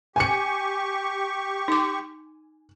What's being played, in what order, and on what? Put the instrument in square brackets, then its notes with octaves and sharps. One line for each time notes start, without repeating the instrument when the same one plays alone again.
[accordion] G4 C#6 [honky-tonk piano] G#5 C#7
[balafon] D#4 D6